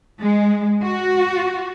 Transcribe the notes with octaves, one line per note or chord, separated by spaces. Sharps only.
G#3
F#4